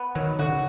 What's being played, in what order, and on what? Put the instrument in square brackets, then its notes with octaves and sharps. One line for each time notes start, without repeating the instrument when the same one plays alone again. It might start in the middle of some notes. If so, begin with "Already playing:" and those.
Already playing: [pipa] B3
[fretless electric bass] D#3 [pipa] F#3
[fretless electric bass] D3 [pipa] F#4
[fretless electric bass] C#3